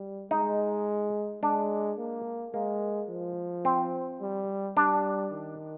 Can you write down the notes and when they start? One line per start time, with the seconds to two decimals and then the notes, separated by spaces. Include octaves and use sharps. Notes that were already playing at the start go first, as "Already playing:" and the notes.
Already playing: G3
0.31 G#3 D#4
1.42 G#3 D4
1.98 A#3
2.54 G#3 A#3
3.09 F3
3.65 C4
4.21 G3
4.77 G3 D4
5.32 D#3